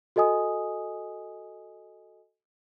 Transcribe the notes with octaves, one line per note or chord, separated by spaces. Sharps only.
F#4 A4 D#5 G#5 D#6